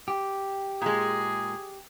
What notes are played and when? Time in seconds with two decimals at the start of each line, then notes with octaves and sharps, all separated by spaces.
0.08 G4
0.82 A#2 G#3 G#4